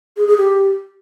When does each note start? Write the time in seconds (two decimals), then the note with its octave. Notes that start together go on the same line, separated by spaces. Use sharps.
0.17 G#4
0.27 G#4
0.37 G4